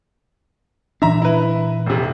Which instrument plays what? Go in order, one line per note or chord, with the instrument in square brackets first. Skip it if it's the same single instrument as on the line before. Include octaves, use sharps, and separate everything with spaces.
[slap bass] A#2 E3 D4 [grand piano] E5 A#5
[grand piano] E4 B4
F1 C3